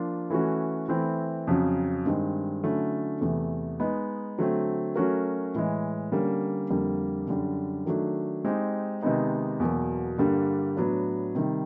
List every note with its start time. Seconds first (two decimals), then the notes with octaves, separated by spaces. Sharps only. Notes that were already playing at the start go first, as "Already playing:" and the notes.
Already playing: F3 A#3 D4 F4
0.30 E3 A3 C#4 F#4
0.88 E3 A3 C4 E4
1.47 F2 C#3 F#3
2.06 G2 D#3 G#3 C4
2.63 D3 F#3 A3 C#4 E4
3.21 E2 C3 E3 A3
3.80 G#3 B3 D#4
4.38 D3 F#3 A3 C4
4.96 F#3 A3 C#4 F#4 A#4
5.54 A2 E3 G#3
6.12 D3 G3 A#3 C#4
6.70 F2 D3 G3 A#3
7.28 F#2 D3 G3
7.86 D#3 F#3 A3 D4
8.45 G#3 C4 D#4 G4
9.02 C3 D#3 G#3 B3 D#4
9.60 E2 B2 F#3 A#3
10.18 G2 D3 G3 A#3
10.77 A2 F#3 B3 D4
11.35 C3 D#3 G3